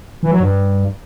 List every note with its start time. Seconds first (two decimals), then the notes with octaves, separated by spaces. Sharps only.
0.23 E3
0.31 F#3
0.40 G2